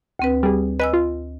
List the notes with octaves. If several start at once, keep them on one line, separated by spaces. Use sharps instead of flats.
D2 C4 B4
G3 G#4
B4 D#5 G#5 E6
F4